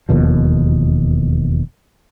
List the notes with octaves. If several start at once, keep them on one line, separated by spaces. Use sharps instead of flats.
E1 D#2 B2 F3